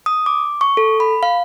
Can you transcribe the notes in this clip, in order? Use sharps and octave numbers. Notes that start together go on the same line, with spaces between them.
D#6
D6
C#6
A4
B5
F5